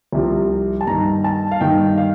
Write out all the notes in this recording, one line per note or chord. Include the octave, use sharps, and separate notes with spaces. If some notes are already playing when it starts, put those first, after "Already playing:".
C2 C3 F3
A5
G2 D#3 A#5
A5
F5
G2 D#3 G5
F5